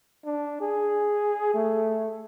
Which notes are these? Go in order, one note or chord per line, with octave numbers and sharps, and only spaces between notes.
D4
G#4
A3